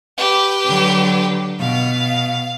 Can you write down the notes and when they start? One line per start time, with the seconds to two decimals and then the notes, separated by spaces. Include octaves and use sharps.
0.18 G4 B4
0.66 D3 F#3
1.60 B2 F5